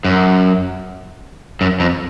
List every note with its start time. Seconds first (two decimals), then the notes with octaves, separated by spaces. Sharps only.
0.05 F#2
1.61 F#2
1.80 F2